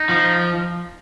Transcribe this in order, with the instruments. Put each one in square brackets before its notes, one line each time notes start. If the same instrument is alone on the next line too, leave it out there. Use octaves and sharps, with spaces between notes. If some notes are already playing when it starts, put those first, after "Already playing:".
Already playing: [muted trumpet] D#4
[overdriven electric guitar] F3